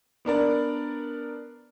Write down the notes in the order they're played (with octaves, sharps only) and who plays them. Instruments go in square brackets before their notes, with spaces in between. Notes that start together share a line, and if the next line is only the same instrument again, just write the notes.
[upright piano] B3 D4 A#4 D5